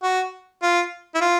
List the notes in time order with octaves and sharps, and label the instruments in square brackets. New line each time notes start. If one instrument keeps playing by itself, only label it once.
[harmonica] F#4
F4
E4
F4